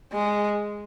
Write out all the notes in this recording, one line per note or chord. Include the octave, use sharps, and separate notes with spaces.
G#3